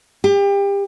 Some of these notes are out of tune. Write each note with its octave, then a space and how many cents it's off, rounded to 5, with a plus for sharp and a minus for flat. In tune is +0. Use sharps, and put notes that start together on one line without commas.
G4 +30